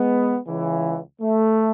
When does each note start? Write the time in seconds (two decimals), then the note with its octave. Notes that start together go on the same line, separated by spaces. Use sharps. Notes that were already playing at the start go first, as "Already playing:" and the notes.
Already playing: G#3 B3
0.45 C#2 C#3 E3
1.22 A3